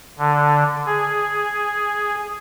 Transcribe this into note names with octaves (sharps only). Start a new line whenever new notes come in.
D3
G#4